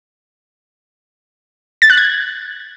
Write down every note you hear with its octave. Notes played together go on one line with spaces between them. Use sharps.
A6
F#6
G#6